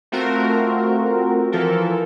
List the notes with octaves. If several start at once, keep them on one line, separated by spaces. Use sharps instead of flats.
A3 C4 F4 F#4 A#4
E3 F3 F4 A4 A#4